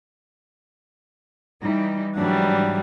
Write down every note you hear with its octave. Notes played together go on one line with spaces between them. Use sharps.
E3 G3 D#4
G#2 E3 F#3 G3 D4